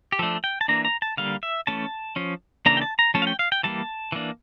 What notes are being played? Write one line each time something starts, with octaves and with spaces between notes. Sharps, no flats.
G4
F3 A3 D4 A4
G5
A5
E3 A#3 D4 A#5
A#5
A5
D3 G3 A#3 F5
E5
E3 A3 C#4 A5
F3 C#4
C#3 E3 A#3 D4 A#5
G5
A5
A#5
F3 A3 C#4 A5
F5
G5
F5
G5
E3 G3 A#3 A5
E3 A#3 D4